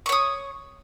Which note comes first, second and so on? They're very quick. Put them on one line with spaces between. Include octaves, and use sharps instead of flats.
C#6 C#5 D#6